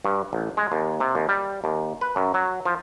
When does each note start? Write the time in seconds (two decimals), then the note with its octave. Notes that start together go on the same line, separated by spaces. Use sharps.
0.05 G2
0.33 A1
0.57 G#3
0.72 D#2
1.00 C3
1.15 D#2
1.29 G3
1.64 D#2
2.01 B4
2.16 F#2
2.34 F#3
2.65 F3